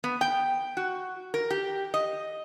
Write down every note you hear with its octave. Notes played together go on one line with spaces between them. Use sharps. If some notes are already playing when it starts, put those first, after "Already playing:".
B3
G5
F#4
A#4
G4
D#5